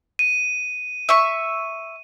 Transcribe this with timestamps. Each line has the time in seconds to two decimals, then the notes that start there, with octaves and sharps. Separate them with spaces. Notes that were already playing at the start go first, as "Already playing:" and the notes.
0.19 D#7
1.09 E5 C#6